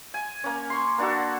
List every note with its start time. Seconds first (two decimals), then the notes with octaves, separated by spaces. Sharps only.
0.14 G#5
0.44 A#3 C#4
0.70 C6 C#6
0.98 A#3 D4 F#4 A4